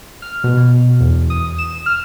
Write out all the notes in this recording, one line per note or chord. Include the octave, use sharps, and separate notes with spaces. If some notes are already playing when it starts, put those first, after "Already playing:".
F6
B2
E2
D#6
E7
F6